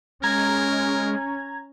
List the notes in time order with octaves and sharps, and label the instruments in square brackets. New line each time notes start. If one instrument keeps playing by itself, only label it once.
[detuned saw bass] G#3 [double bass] C#4 [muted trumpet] A#4 [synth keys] A#5 G#6